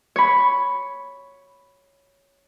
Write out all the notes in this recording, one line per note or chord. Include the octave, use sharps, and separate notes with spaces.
C#5 B5